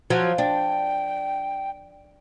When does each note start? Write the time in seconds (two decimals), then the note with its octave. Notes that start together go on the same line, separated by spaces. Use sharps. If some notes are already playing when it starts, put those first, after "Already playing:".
0.10 F3 F#3
0.38 D4 G5